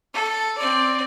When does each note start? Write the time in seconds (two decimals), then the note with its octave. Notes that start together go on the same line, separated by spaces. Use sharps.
0.14 A4
0.58 C4 D5